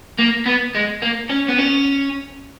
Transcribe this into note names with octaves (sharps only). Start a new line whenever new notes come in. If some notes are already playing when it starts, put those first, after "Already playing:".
A#3
B3
G#3
A#3
C#4
B3
C#4